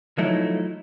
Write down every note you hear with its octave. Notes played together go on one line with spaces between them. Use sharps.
F3 F#3 A3 D#4 E4